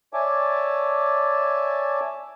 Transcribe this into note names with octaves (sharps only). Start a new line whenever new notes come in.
C#5 D5 E5 G#5 A5 D6